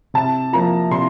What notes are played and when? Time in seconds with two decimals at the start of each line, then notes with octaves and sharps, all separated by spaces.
0.14 C3 A5
0.53 F3 A#3 A#5
0.91 C3 C6